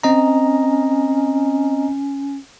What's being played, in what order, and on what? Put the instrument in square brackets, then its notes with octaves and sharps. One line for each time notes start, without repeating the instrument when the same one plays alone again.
[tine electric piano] C4 D#5 A#5 [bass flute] C#4